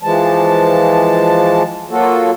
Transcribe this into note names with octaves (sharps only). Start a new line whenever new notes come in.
E3 F3 G#3 A5
F#3 A#3 F4 F#4 A4